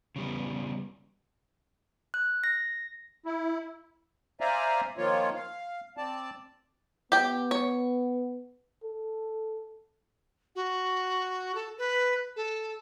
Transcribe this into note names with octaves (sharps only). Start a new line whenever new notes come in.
C#3 G3 B3
F#6
A#6
E4
C5 D5 E5 F5 G#5 A#5
D#3 F3 A#3 F4 C#5
F5
C4 D5 A5
B3 G4 G5
C#5
A4
F#4
A4
B4
A4